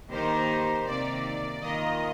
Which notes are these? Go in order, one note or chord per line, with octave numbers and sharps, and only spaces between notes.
D#3 A#3 D#4 G4 A#4 C5
C3 D#3 A#3 D5
D#3 A#3 F4 A#4 D#5